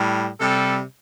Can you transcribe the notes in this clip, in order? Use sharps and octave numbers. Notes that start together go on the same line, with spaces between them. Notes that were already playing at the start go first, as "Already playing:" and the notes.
Already playing: A2 G3
C3 G3 A4